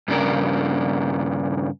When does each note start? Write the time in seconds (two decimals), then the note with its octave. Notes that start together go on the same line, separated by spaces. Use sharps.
0.08 G2 C#3 D4 A#4